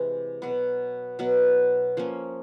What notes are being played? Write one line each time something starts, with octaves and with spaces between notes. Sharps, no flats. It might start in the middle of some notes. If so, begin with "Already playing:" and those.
Already playing: C3 E3 G#3
B2 F#3 B3
B2 F#3 B3
F3 A#3 C#4